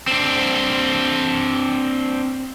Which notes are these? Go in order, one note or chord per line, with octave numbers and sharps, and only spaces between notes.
C4 D4